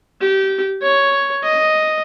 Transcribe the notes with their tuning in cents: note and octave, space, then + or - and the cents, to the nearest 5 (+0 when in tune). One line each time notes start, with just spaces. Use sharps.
G4 -20
C#5 +5
D#5 +0